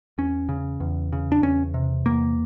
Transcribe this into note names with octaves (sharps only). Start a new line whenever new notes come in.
E2 C#4
C#3
E2
C#3
D4
E2 C#4
C3
E2 A#3